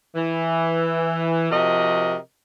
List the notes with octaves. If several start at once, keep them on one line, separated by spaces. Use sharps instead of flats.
E3
C3 F3 F#4 A#4 D#5